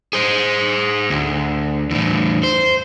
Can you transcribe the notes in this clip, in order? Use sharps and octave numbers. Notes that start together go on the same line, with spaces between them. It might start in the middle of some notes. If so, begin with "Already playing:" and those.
G#4 C5
D2
E2 A2
C5